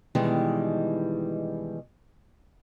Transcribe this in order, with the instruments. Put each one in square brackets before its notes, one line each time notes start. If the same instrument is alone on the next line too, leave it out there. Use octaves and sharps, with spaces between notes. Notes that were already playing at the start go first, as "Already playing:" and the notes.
[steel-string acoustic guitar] B2 D#3 E3 G3 G#3